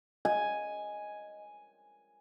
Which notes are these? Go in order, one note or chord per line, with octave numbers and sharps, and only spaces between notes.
D#5 G#5